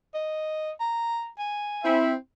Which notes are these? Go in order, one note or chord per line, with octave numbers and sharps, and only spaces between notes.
D#5
A#5
G#5
C4 E4 E5